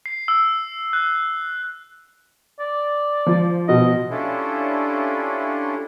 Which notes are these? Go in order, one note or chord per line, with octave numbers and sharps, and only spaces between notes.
C7
E6
F#6
D5
F3
B2 D#5
G3 C#4 D4 E4 F4 A4